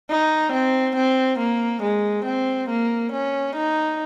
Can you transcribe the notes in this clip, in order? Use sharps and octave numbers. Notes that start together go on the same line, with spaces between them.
D#4
C4
C4
A#3
G#3
C4
A#3
C#4
D#4